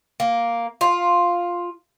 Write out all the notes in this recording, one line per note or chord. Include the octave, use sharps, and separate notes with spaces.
A#3
F4